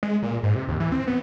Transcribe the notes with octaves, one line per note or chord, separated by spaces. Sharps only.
G#3
A#2
G#2
C3
D#2
E3
C4
B3